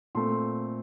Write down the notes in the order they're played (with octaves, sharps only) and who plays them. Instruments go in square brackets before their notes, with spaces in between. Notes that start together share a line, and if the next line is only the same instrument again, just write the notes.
[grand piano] A#2 A3 C4 C6